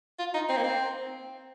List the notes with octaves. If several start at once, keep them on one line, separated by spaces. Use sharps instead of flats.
F4
D#4
C4
A#3
C4